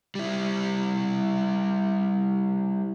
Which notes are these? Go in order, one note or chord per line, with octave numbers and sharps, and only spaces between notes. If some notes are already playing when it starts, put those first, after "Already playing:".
G3 E4